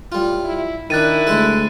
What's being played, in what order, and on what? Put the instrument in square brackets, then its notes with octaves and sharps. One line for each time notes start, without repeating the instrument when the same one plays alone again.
[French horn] A2 [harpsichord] G3 F4
[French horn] E4
[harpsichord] D#3 D4 [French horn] E4 [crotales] F#6 A6 D#7
[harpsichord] D2 G#3 A4